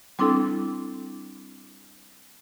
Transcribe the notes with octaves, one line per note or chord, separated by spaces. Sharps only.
G3 C4 D4 E4 A4